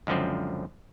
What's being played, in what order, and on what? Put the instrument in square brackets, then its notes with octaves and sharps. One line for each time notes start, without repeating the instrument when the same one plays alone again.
[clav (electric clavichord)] C#2 F#2 D3 F3 C4